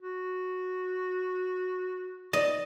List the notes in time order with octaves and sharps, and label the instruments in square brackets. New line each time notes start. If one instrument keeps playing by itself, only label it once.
[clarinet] F#4
[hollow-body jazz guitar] D5 [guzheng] D#5